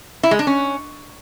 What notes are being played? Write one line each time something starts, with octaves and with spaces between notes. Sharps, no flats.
E4
G#3
D4
C#4